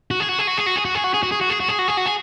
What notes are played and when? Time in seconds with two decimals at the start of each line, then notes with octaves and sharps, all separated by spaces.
0.11 F#4
0.20 G#4
0.29 F#4
0.39 G#4
0.47 F#4
0.58 G#4
0.67 F#4
0.76 G#4
0.85 F#4
0.95 G#4
1.04 F#4
1.13 G#4
1.23 F#4
1.31 G#4
1.41 F#4
1.50 G#4
1.60 F#4
1.68 G#4
1.79 F#4
1.88 G#4
1.97 F#4
2.06 G#4